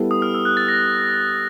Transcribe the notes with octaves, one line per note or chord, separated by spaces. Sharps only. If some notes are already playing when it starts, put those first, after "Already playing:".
Already playing: G3 B3 E4 A4
D#6
F6
E6
F#6
A6
A#6